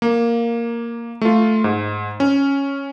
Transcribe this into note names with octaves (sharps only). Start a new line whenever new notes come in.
A#3
A3 F4
G#2
C#4